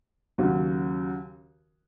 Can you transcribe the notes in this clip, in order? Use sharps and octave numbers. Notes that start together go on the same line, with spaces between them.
D#2 C#3 F#3 C#4 F#4